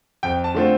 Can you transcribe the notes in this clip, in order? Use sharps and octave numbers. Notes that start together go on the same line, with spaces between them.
F2 G5
A5
D3 A3 C4 F4